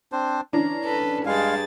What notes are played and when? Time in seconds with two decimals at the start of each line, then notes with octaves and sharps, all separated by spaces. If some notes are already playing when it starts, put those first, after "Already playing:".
0.12 C4 D4 C5
0.53 E3 C#4 D4 A#5
0.85 A4 B4
1.26 G2 G#3 G#4 F5 A6